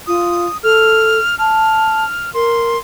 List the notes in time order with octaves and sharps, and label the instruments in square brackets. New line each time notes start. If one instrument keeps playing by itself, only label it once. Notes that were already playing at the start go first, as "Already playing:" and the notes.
[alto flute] F4 [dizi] D#6
[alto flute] A4 [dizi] F6
[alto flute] A5 [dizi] F6
[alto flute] A#4 [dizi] C6